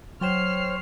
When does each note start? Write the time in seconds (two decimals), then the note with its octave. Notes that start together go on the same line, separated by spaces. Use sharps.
0.21 F#3 C5 C#5 G5 F6 C7 E7